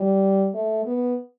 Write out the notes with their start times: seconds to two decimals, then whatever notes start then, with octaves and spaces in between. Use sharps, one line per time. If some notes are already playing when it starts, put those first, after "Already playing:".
Already playing: G3
0.54 A3
0.86 B3